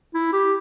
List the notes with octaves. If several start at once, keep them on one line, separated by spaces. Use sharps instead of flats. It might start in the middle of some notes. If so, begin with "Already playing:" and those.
E4
G4